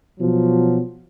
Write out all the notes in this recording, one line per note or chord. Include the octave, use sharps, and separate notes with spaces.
B2 F3 F#3